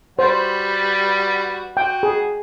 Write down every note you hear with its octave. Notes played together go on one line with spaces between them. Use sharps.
G3 F#4 B4 C5
F#4 G5
G#4